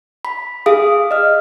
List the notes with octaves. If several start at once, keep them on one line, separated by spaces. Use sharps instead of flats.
B5
G#4 F5 D#6
D#5 F6